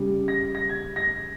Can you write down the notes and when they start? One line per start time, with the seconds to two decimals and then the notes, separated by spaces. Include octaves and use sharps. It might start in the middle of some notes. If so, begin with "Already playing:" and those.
Already playing: C#3 G3
0.28 A#6
0.55 A#6
0.69 G#6
0.96 A#6